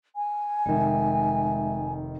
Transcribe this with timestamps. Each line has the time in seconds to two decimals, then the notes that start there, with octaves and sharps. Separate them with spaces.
0.16 G#5
0.66 F1 D#3 G#3 E5